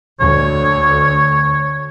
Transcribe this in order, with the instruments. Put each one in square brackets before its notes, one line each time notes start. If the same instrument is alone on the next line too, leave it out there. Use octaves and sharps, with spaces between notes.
[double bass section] D2 [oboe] C#5